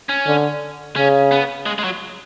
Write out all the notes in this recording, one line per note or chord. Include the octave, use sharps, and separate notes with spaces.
C#4
D3
C#3 C#4
B3
G#3
G#3
F#3